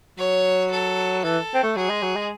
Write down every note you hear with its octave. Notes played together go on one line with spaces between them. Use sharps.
F#3 C#5
A4
E3 A4
C4
A3
F#3 G#4
G#3
F#3
G#3